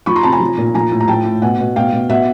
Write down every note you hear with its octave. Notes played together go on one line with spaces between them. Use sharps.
F3 B5 C#6
A#5 C6
C3 A5 B5
G#5 A#5
F3
A#2
F3 G#5 A#5
A2
A#5
F3 G5 A5
A2
B2 F#5 G#5
B2
B2 F5 G5
B2
B2 E5 F#5